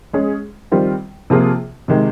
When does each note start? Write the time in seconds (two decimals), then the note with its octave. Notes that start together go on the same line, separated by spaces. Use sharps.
0.13 G#3 C#4 G#4
0.72 D#3 G3 C4 F4
1.30 C3 F3 A#3 F4 G#4
1.88 C3 D#3 G#3